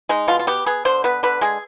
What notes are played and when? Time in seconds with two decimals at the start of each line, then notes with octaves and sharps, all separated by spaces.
0.09 G#3 D#4
0.28 B2 F4
0.39 F4
0.47 B3 G4
0.66 B3 G#4
0.85 D3 C5
1.04 B3 B4
1.23 D3 B4
1.41 G#3 G#4